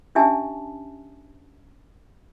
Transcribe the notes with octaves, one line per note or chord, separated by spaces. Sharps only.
C#4 D4 G4 E5 G#5 A5